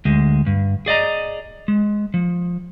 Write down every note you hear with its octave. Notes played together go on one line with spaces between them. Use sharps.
D2 G#3
G2
G#4 D5 D#5 A#5
G#3
F3